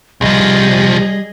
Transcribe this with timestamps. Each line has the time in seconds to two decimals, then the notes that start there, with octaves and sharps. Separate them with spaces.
0.21 C2 F3 G3 G#4 D#5